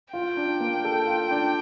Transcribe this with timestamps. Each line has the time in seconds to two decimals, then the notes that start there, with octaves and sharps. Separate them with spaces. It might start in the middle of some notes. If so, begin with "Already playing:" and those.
0.13 F4 G5
0.37 D4
0.60 A#3
0.85 A4
1.07 F4
1.31 D4